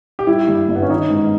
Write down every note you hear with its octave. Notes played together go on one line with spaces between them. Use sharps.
G4
G3 E4
G2
G1
B3
C#4
D#3 D#4
G#2